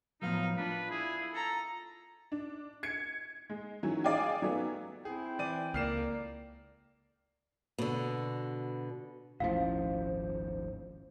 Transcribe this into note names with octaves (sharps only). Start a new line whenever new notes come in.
A2 F3 F#3 B3 D#4 F5
D4 F4 B4
E4 G#4
A4 A#5
D4
G#6 C#7
G#3
D#3 E3 F#3 C#4
G#4 D5 F5 G5 G#5
D#3 F#3 A3 B3
C4 E4 G#4 G5
E3 D5 D#7
C#2 A#3 D5 F6 C7 E7
B2 D3
D#1 G#1 F3 A3 C#4 E4 C5 F5